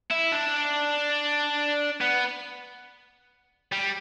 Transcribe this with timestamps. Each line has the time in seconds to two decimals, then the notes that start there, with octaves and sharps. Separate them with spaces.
0.10 E4
0.32 D4
2.01 B3
3.72 G3